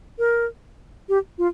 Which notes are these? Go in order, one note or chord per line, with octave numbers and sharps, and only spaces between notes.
A#4
G4
F4